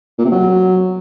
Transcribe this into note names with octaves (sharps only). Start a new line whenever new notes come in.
A#2
C3
F#3